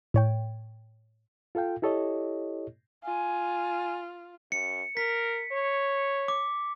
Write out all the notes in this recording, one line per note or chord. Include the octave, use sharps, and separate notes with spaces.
A2 C#5 G5
F4 A4 F5 G5
E4 G4 A4 C#5 D#5
F4 G#5
F#2 C#7
A#4 B6
C#5
D6